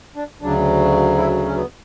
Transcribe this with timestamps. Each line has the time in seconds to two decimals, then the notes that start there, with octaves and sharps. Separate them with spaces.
0.16 D4
0.41 D2 C#3 F#3 D4
1.17 E4
1.46 C#4
1.55 B3